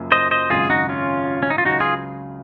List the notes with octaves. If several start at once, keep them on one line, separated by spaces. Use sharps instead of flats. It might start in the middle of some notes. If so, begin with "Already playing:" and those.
Already playing: F#1 F#2 C#3 F3 A#3
C5 D#5
C5 D#5
G#1 F#2 C#3 G#3 F4 G#4
D#4 F#4
C#4 F4
C#4
D#4
F4
C#2 C#3 F#3 D#4 F#4
F4 G#4